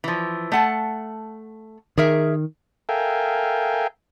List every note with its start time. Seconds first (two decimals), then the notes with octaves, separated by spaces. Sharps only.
0.04 E3 F3
0.52 A3 F#5 A5
1.98 D#3 G#4 A#4 E5
2.89 A4 A#4 E5 F5 G5 G#5